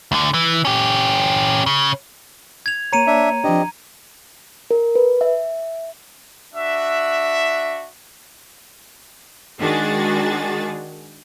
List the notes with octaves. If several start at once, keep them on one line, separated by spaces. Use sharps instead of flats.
D2 D3
E3
C#4 G4
C#3
G#6 F7
A#3 C#5 A#5 C#7 D#7
D4 E5
F3 C4 D4 G4 D#5
A#4
B4
E5
D4 F#4 E5
D#3 G#3 D4 F#4 G#4 A6